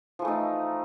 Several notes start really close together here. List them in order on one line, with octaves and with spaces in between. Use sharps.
F3 E3 A3 D#4